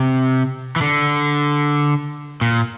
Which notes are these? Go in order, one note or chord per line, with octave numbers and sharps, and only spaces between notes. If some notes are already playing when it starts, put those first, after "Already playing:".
Already playing: C3
E3
D3
A#2